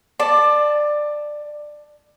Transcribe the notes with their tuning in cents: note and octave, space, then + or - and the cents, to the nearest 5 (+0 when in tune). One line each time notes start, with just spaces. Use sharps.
D5 +15 A5 +0